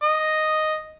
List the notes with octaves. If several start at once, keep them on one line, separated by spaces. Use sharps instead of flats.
D#5